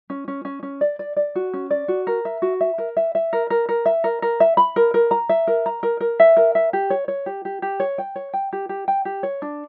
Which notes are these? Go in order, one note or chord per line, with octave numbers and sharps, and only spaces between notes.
C#4
C#4
C#4
C#4
D5
D5
D5
F#4
C#4
D5
F#4
A#4
E5
F#4
E5
A#4
E5
E5
A#4
A#4
A#4
E5
A#4
A#4
E5
B5
A#4
A#4
A#5
E5
A#4
A#5
A#4
A#4
E5
A#4
E5
G4
C#5
C#5
G4
G4
G4
C#5
G5
C#5
G5
G4
G4
G5
G4
C#5
D4